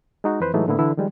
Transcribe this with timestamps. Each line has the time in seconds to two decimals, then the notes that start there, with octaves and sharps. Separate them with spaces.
0.24 G#3 D#4 F#4
0.40 F2 E3 B4 C5
0.54 A2 E3 F#3 G#3 A3 D#4
0.67 A2 D3 A#3 B3 E4
0.79 D3 E3 E4
0.97 D#3 F3 G3 G#3